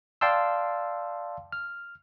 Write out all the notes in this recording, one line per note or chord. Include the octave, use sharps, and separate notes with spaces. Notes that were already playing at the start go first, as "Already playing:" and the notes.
D5 F5 G5 A5 C6 E6
F6